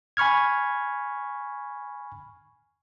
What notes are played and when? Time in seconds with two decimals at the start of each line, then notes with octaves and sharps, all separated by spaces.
0.17 G#5 B5 C#6 F6 G#6